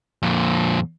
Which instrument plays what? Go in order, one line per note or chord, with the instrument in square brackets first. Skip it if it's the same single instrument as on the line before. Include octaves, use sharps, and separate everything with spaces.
[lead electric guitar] F2 A#2